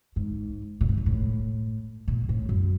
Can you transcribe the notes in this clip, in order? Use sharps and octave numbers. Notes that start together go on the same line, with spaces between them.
G#2
A#2
A2
G#2
A2
A#2
A2
F#2